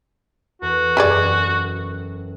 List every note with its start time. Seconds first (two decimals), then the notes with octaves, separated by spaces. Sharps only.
0.62 E2 F#4 A4 B6
0.97 E1 F#2 G4 G#4 D5 B5